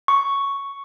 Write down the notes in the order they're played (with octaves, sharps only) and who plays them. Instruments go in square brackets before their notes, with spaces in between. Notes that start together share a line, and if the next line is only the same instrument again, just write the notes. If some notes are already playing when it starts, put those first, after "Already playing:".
[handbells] C#6